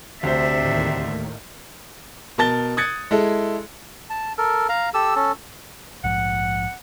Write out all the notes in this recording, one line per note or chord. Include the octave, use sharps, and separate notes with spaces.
D2 C3 D4 C5 E5
D#2 A2 D#3
B2 A#4 A5 A6 G7
D#6 F#6 G#6 A6 C#7
G#3 E4 A4
A5
A4 A#4
F5 A#5
G4 A4 E6
C#4 A4
A#1 G#2 F3 F#5